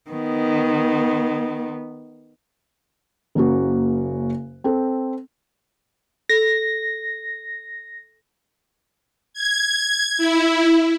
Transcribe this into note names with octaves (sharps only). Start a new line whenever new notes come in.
D#3 B3
F#1 C#3 A#3 F#4
C4 A4
A4 A#6
G#6
E4